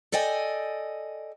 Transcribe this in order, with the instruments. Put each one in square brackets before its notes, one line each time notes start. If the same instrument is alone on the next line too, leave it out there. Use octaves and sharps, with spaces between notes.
[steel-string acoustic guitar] A4 D5 D#5 G5 G#5